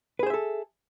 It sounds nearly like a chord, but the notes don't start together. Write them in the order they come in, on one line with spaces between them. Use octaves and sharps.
B4 G#4 C5 E5 A4